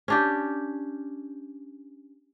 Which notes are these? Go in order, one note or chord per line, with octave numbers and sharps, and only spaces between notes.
C#4 D4 G4